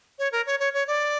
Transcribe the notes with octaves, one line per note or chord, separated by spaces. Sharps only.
C#5
A#4
C#5
C#5
C#5
D5